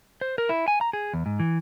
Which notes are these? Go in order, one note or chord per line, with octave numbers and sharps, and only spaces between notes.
C5
A#4
E4
G#5
A#5
G#4
E2
G#2
E3